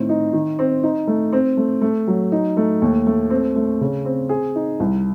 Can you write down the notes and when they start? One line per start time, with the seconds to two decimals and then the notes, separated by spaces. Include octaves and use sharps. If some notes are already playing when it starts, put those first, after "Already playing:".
Already playing: A2 D#3 C4
0.09 D#4
0.33 D#3
0.59 C4
0.83 D#4
1.07 A3
1.33 C4
1.57 A3
1.82 A3
2.08 F#3
2.32 D#4
2.57 A3
2.82 D#2
3.07 A3
3.30 C4
3.56 A3
3.81 C#3
4.05 C4
4.29 G#4
4.55 D#4
4.80 C2